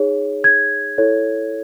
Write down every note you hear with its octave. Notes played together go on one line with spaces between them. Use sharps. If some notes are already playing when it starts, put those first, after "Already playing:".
Already playing: D#4 G#4 C#5
G#6
E4 A4 C#5